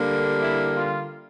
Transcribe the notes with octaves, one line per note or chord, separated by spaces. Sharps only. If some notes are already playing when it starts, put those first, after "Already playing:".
Already playing: D3 G3 A#3
E4
F4